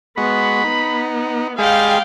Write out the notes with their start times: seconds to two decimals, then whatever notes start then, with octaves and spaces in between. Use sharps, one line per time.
0.18 G#3 B3 F#4 B5
0.64 B3 D#4
1.58 G3 G#3 G#4 F5 G5